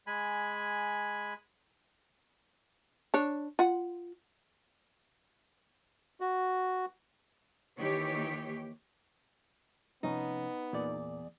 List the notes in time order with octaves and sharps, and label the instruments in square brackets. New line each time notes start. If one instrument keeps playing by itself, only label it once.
[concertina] G#3 G#5 B5
[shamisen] D4 C#5
F4 F#5
[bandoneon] F#4
[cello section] D#2 E3 G4 C#5
[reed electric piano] C3 F3 C#4 [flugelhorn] B3 [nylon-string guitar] D#4
[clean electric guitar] E2 D5 [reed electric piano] A#2